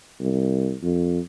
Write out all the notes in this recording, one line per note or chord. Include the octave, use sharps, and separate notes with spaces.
C2
F2